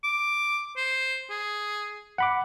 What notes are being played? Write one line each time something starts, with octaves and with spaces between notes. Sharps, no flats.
D6
C5
G#4
F#5 B5 D6